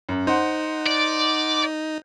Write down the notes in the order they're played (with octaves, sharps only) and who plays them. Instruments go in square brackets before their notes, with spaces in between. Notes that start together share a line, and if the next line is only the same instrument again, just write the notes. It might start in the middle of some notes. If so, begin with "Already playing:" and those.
[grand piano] F#2
[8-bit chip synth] D#4 [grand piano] C5 F#5
[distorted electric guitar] D5